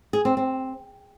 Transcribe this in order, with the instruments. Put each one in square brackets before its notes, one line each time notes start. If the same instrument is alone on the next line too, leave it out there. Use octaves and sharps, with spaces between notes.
[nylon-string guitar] G#4
C4
C4